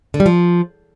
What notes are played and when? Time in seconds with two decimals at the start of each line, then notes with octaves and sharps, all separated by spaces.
0.14 D3
0.20 G3
0.26 F3